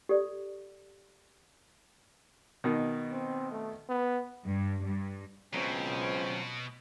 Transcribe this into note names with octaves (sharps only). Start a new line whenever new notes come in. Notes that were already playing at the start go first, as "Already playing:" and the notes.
G4 A4 D5
B2 D#3
C4
A3
B3
G2
G2
C#2 B2 F#3 C4 C#4 C5